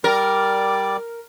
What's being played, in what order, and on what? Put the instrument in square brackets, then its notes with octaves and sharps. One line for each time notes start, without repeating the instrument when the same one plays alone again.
[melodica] G3 D5 D6 [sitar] A#4